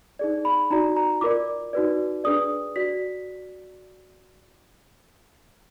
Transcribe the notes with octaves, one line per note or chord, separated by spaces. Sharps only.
D#4 G#4 D5
B5
D#4 F#4 D5 A#5
A#5
F4 A#4 D5 D6
D#4 F#4 B4 D5
D4 G#4 B4 D5 D#6
F#4 D5 B6